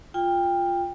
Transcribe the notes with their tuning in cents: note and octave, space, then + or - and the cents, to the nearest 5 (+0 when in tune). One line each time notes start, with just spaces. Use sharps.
F4 +0 G5 +20